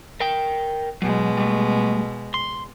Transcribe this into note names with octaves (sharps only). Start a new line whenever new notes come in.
A#4 G5
B2 F#3 G#3
G3 A3
C6